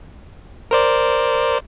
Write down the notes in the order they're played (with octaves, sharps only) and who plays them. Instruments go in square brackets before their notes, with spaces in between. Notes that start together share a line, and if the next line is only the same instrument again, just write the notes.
[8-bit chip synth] A#4 C5 D5